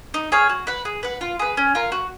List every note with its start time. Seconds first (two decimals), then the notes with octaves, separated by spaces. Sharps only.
0.14 D#4
0.32 G#4 C#5 F5
0.49 F#4
0.67 B4 F#5
0.85 G#4
1.03 B4 F#5
1.21 F4
1.39 G#4 B4
1.57 C#4
1.75 F4 A#4
1.92 F#4